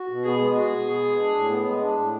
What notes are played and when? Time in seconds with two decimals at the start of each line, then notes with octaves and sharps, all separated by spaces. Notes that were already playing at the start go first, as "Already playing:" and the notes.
Already playing: F#4
0.10 B2
0.24 B3 G#4
0.40 G#3
0.56 F#4 G#4
0.72 B2
0.87 B3
1.03 G#3
1.18 D4
1.35 A2
1.49 B3
1.66 G#3
1.81 D4
1.97 A2